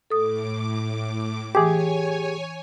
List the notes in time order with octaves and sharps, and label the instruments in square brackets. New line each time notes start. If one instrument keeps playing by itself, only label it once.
[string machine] A2 D6 [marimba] A4 D#6
[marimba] E3 D6 [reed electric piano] G4 G#4 [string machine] C#5 G#5